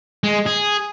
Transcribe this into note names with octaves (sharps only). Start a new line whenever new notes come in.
G#3
G#4